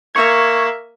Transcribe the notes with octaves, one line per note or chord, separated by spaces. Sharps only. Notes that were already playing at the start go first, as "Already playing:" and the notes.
A#3 E5 C#6 G#6